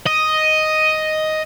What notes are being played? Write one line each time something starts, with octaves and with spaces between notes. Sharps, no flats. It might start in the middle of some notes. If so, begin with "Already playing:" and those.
D#5